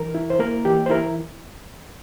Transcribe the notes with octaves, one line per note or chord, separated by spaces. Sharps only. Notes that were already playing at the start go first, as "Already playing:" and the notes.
Already playing: E3 A#4
E4
C5
A#3 A#4
E3 G4
C5
E4 A#4